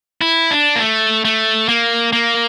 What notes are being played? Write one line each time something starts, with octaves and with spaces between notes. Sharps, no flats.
E4
D4
A#3
A3
A3
A#3
A#3